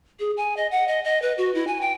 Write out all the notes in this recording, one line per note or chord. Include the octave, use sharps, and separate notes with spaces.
G#4
G#5
D#5
F#5
D#5
D#5
B4
F#4
E4
G#5
G5